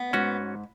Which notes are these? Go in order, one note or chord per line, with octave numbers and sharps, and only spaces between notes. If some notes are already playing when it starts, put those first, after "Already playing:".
Already playing: B3
G#2 C#4 F#4